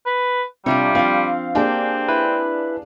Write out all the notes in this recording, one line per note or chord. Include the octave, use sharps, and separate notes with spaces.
B4
C3 G3 D4 F4 C#5
F3 C4 F5
A#3 C4 D4 G4 G#4
E4 B4